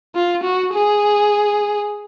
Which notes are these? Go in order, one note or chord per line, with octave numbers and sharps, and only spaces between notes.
F4
F#4
G#4